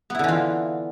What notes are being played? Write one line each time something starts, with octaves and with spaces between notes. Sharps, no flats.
D3 E3 B3 E4 F4